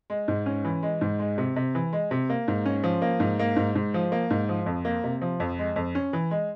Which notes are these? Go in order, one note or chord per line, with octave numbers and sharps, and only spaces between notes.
G#3
G#2
C#4
E3
G#3
G#2
G#3
C3
C3
E3
G#3
C3
A#3
G#2
C#4
F3
A#3
G#2
A#3
G#2
G#2
F3
A#3
G#2
F3
F2
A#3
C3
F3
F2
G#3
F2
C#4
E3
G#3